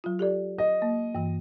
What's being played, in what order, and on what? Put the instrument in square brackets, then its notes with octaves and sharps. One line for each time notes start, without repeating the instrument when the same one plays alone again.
[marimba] F#3 F4
G4 A4 D5
[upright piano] D#5
[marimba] A#3
G2 E3